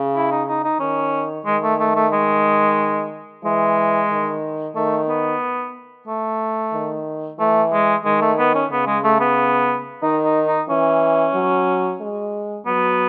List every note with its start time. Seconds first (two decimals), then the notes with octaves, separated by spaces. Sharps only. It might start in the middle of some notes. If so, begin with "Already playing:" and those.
Already playing: C#3
0.15 E4
0.31 D#4
0.48 D#4
0.64 D#4
0.80 D#3 C#4
1.46 D#3 G#3
1.63 A3
1.80 A3
1.95 A3
2.13 G#3
3.44 E3 G#3
4.11 D#3
4.76 D#3 A3
5.09 B3
6.08 A3
6.73 D#3
7.39 E3 A3
7.73 G#3
8.05 D#3 G#3
8.22 A3
8.39 B3
8.55 C#4
8.72 C#3 B3
8.87 G#3
9.04 A3
9.20 B3
10.02 D#3 D#4
10.25 D#4
10.47 D#4
10.69 E3 C#4
11.34 F#3
12.01 G#3
12.66 F#3 B3